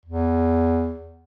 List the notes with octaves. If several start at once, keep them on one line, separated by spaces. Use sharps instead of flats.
E2